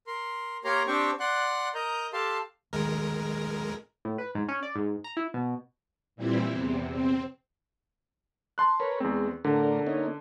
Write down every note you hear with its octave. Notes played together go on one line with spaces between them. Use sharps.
A#4 C6
A#3 G4 A#4 C#5 A#5 C6
C4 D4 G4 C5 G5 C#6
D5 F#5 C6 F#6
A#4 D#5 A#5 G6
G4 A4 F5 A5 C6
A1 D#2 G#3 A#4
A2
B4
G#2
C#4
D5
G#2
A#5
E4
B2
A#2 E3 G3 C4 E4
E2 C3
C4
A5 C6 F#6
A#4 B4 C#5
E2 G#3 C4
A2 D3 D4 A#4
A#3 C#4 D#4